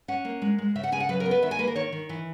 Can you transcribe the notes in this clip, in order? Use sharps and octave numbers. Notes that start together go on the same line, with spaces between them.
C#4 F#5
A#3
G#3
G#3
C#3 E5
F#5
C#3 G#5
F#5
F#3 B4
A#4
B3
B4
D#3 E5
G#5
A#3 B4
A#4
D#3 C#5
D#3
E3